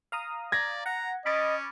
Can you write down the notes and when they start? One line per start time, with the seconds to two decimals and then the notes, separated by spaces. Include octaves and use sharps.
0.12 F5 A#5 D#6
0.52 D5 G#6 A#6
0.86 F#5 A#5
1.26 C#4 D#5 B5 D6 A6